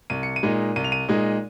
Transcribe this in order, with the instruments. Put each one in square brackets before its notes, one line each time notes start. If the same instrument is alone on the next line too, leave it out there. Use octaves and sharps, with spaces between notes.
[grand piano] C2 D#7
C#7
D#7
A#2 G#3 D#4
C2 D#7
F7
D#7
A#2 G#3 D#4